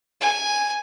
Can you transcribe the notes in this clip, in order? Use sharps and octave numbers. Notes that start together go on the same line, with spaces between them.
G#5